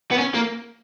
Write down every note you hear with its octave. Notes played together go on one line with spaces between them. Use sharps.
B3
C#4
A#3